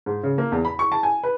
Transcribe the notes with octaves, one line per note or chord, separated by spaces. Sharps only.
G#2
C#3
A#3
E2
B5
C#6
A5
G#5
B4